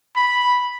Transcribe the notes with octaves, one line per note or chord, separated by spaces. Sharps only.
B5